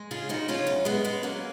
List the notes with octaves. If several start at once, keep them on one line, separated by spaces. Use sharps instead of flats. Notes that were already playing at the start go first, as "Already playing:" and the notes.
Already playing: G#3
C#3 F4 G#4
F3 D#4 F#4
C#3 C#4 F4
F#2
G#3 B3
G#3 B3
F#3 A#3 C#4